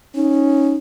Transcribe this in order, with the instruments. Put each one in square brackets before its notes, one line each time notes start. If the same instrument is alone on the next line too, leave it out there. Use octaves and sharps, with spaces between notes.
[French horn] C#4 [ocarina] D#4